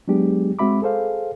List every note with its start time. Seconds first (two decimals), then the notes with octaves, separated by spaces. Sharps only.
0.08 F#3 G#3 B3 D4 G4 G#4
0.59 G#3 C4 F#4 E5 B5 D6
0.82 G#4 A4 C5 F5